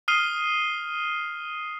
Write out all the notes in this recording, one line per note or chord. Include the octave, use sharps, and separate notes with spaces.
D#6 F6 C7 D#7 G7